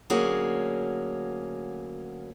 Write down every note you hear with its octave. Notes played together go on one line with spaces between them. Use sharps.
D2 F#3 A#3 C#4 G#4 F#5